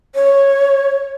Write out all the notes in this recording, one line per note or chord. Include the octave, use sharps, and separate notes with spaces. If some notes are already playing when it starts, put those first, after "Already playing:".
C#5